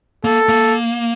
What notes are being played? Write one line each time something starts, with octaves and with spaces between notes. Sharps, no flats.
A#3 A4
A#3